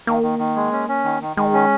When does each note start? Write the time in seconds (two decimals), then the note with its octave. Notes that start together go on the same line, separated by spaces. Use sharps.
0.07 D#3 A#3
0.23 D#3
0.39 D#3
0.56 G#3
0.72 C#4
0.89 C#4
1.04 D#3
1.21 D#3
1.37 D#3 G#3
1.53 C#4